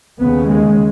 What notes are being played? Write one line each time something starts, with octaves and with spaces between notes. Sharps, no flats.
D#2 C#3 B3
G#3